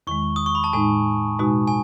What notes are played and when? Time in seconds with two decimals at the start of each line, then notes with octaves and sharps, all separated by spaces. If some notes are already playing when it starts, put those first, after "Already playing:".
0.07 E2 D#3 G#3 C#6
0.36 D#6
0.46 C#6
0.55 B5
0.64 A5
0.73 A2 G#3 D#4 G#5
1.39 B2 G#3 D#4 F#4
1.68 G#5